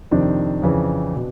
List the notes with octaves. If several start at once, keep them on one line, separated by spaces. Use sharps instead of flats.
F2 C3 D#3 C4 D4
F2 C#3 E3
B2